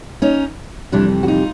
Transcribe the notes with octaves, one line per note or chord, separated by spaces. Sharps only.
C#4 D#4
F2 C3 E3 G3 D4 E4
F#4
D#4 F4